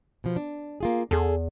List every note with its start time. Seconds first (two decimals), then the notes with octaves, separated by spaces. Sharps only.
0.24 B2 F3
0.36 D4
0.80 A#3 F4 G#4
1.11 E2 G#4 A4